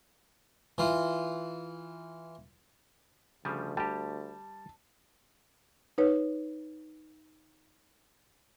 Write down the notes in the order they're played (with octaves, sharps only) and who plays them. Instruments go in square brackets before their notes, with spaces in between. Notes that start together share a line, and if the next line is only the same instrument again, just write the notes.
[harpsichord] E3 F4
[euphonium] D2 [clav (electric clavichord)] C#3 F3 G3
[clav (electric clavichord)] G3 G4 [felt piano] A5
[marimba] D#4 B4 C#5